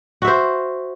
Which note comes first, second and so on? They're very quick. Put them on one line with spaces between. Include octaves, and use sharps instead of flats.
F#4 E5 C5